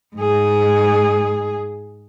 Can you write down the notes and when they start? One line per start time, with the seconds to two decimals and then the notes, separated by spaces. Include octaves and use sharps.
0.16 G#2 G#4